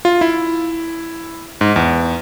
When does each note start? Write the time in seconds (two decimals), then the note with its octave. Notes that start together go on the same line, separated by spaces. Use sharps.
0.05 F4
0.21 E4
1.61 G#2
1.76 E2